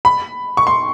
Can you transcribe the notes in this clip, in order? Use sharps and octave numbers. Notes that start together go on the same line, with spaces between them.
B5
C#6
C6